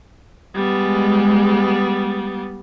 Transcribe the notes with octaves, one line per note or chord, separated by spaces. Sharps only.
G3 G#3 B3